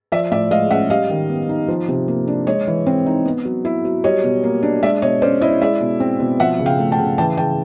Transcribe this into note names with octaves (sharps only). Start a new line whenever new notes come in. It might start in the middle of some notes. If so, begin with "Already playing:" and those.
F3 D5 E5
A2 D5 E5
G#3 D#5 F5
C#4 E5 F#5
G3 D#5 F5
D#3
B3
D#4
F3
C3
A#3
D4
G#3 C#5 D#5
E3
C4
D#4
B3
F#3
E4
F#3
G3 C#5 D#5
B2
A#3
D4
G#3 D5 E5
B2 C#5 D#5
C#4 C5 D5
E4 C#5 D#5
G#3 D5 E5
B2
C4
B2
F3 E5 F#5
C#3
F5 G5
A3
G5 A5
C#3
E3 G5 A5
C#3 G5 A5